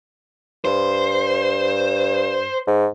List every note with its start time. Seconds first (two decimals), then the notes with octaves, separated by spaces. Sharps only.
0.65 G2 C5
2.67 G#2